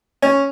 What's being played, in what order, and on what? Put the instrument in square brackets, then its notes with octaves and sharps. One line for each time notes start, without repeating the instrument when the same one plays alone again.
[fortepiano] C#4